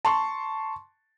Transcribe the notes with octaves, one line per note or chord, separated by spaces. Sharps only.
A5 C6 C#6